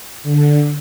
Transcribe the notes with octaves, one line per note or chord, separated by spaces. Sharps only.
D3